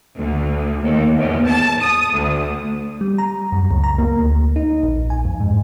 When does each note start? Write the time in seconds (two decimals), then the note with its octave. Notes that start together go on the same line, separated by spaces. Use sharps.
0.17 D2
0.83 D#2
1.17 E2
1.49 A5
1.82 D#6
2.13 D2
3.01 G3
3.18 A#5
3.52 F#2
3.71 C#2
3.84 A#5
3.98 A#3
4.19 D2
4.56 D#4
4.83 A#1
5.10 G#5
5.25 F2
5.40 G#2